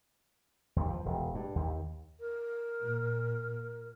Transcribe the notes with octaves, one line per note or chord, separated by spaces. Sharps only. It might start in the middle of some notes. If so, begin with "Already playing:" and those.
D#2
F3
E1
G2
D#2
A#4
A#2